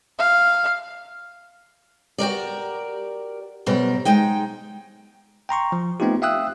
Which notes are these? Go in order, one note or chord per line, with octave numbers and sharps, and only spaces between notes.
F5
F#4 G4 A#4 D5
F#2 B2 G3 A#4 C5
G#3 D#4 G5
G5 A#5 C6 C#6
F3
A3 B3 C4 D#4 F4 G4
E5 F5 G5 D#6 E6 F#6